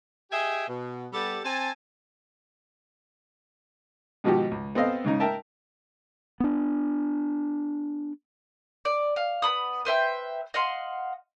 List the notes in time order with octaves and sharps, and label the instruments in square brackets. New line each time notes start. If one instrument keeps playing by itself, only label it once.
[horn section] G4 G#4 D#5 E5 G5 G#5
B2
G3 B3 G4 A4 D5 A5
C4 G#5 A5
[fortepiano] G#2 B2 D#3 F3 F#4 G4
C#2
B3 C4 A4 D#5 F5
G#2 C#3 D#4
A#4 E5 G5 A5
[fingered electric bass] B3 D4
[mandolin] D5
F5
B3 B5 D#6
B4 C5 E5 G5
D#5 F5 F#5 C6